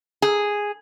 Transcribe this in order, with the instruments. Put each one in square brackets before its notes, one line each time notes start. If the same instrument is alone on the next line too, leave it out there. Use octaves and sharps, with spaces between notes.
[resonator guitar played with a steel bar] G#4